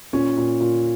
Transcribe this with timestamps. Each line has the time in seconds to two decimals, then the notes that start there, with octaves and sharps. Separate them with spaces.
0.13 A#2 C#4
0.37 A#2
0.61 A#2